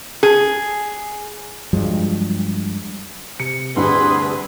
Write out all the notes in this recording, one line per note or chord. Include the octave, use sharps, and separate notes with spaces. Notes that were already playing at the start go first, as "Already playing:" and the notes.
G#4
G2 F3 F#3 G#3
C3 C#7
D2 G2 C3 G#4 B4 C6